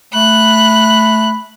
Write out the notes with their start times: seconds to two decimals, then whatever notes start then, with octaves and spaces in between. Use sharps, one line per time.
0.14 A3 B5 F#6